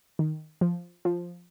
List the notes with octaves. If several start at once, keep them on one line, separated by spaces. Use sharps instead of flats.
D#3
F3
F3